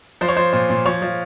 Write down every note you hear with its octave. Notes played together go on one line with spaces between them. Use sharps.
F3 C5
C#5
F3 C5
A#2 C5
A#2
F3 C#5
F3